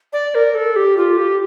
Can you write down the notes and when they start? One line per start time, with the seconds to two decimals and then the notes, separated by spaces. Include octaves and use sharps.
0.13 D5
0.35 A#4
0.55 A4
0.76 G4
0.97 F4
1.18 G4